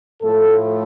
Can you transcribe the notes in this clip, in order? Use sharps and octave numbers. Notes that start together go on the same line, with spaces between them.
A2 F3 A3 A4